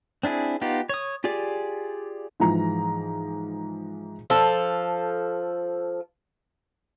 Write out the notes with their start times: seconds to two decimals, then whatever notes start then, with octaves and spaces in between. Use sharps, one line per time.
0.23 C4 D4 E4 G#4
0.61 B3 D#4 F4 G4
0.89 C#5 D#6
1.24 F4 G4 G#4 D5
2.40 G#2 E3 F3 G#4 A#5
4.30 F3 A4